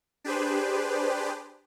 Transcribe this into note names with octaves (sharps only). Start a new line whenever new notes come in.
D4 G4 G#4 B4 C5